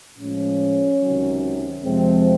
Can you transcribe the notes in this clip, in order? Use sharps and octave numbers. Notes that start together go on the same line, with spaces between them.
A2 F3 G#3 C#4
C#2 C3 D#3 F#3
F2 C3 F3 G#3 C4